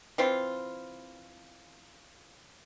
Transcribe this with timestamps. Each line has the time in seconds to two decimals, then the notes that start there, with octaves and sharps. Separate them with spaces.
0.18 E3 C4 F4